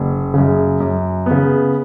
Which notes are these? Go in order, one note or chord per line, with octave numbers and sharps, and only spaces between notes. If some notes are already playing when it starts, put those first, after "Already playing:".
Already playing: F#1
F#2 C#3
F#2
C#3 B3